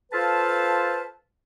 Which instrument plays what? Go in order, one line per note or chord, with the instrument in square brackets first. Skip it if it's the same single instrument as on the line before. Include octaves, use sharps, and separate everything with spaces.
[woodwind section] F4 A4 B4 C5 F5 A5